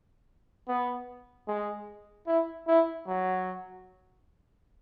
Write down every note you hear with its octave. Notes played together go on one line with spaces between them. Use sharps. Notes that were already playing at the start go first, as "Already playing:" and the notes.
B3
G#3
E4
E4
F#3